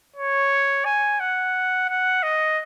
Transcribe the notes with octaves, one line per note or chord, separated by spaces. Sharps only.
C#5
G#5
F#5
F#5
D#5